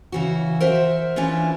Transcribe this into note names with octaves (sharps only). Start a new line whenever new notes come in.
C#3 E3 F#4
A#4 C5 E5 F#5
E3 C#4 D4 E4 F4